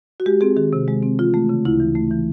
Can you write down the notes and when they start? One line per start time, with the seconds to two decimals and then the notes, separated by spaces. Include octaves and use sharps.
0.20 F#4
0.26 G#3 G4
0.41 C4 G#4
0.57 D#3 G#4
0.73 C3
0.88 G#3
1.03 C4
1.19 E3 F4
1.34 A3
1.49 C#3
1.65 D2 E4
1.80 E3
1.96 A3
2.11 E3